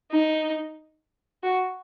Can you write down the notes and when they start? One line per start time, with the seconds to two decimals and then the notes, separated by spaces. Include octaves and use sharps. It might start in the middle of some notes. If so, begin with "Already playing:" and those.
0.12 D#4
1.43 F#4